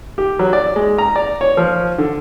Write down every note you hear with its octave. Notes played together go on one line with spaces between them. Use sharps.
G4
F#3
D5
G#3
A#5
D5
C#5
F3
D3